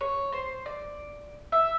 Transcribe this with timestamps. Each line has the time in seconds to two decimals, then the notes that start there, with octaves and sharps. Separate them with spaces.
0.01 C#5
0.32 C5
0.66 D5
1.52 E5